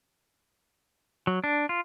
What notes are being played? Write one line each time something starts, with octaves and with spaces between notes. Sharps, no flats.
F#3
D4
F4